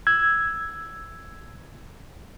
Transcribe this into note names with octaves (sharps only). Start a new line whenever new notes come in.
E6 G#6